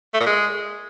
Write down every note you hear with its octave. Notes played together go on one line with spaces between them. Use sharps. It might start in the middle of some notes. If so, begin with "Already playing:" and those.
A3
A#2
G#3